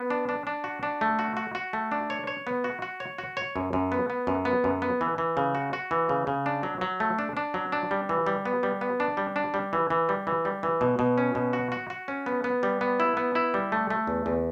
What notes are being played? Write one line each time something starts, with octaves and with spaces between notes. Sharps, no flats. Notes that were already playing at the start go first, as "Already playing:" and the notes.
Already playing: B3
D4
D4
D4
F#4
D4
A3
F#4
F#4
F#4
A3
D4
C#5
C#5
B3
F#4
F#4
C#5
F#4
C#5
F#2
F#2
B3
B3
F#2
B3
F#2
B3
E3
E3
C#3
F#4
F#4
E3
C#3
C#3
D4
F#3
F#3
A3
D4
D4
F#3
D4
G3
E3
G3
B3
G3
B3
D4
G3
D4
G3
E3
E3
G3
E3
G3
E3
B2
B2
C#4
B2
F#4
F#4
F#4
C#4
B3
B3
G3
B3
E4
B3
E4
G3
A3
A3
E2
E2